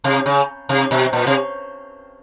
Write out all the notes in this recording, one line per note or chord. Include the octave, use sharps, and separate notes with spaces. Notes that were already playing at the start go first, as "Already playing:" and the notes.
C3
C#3
C3
B2
A#2
C3